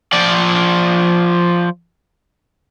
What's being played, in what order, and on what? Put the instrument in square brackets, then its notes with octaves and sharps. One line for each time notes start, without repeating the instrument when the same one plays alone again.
[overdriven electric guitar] F3 D5